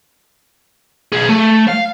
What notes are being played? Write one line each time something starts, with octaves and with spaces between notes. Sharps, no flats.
B1 G#4
A3
F5